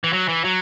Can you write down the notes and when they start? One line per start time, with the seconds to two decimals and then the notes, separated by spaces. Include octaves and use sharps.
0.04 E3
0.13 F#3
0.28 E3
0.44 F#3